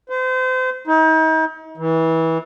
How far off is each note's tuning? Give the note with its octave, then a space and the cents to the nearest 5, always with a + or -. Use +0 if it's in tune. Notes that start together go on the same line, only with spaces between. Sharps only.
C5 -35
D#4 +40
E3 -25